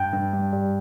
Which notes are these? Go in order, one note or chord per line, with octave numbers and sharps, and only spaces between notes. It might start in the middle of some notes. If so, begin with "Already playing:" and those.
Already playing: G2 G5
G2
G3
G3